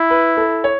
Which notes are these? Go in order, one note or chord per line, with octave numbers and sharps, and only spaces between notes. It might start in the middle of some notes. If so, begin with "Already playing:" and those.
Already playing: E4
B4
A4
C#5